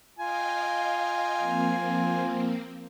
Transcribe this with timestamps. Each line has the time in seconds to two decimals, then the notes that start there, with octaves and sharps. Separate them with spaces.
0.19 F4 D#5 F5 G5 G#5
1.39 F3 A#3 C4